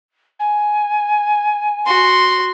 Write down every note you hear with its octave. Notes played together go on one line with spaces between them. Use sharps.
G#5
F#4 C6